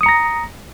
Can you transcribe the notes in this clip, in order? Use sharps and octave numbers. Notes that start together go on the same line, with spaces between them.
A#5 D#6 A#6 C#7